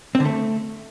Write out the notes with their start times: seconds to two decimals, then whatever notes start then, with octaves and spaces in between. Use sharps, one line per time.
0.15 C4
0.20 D3
0.25 A3